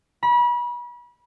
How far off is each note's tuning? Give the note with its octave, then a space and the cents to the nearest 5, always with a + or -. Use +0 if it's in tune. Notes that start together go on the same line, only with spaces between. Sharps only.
B5 -35